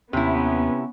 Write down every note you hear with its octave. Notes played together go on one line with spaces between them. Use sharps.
D#2 C3 B3 C#4 E4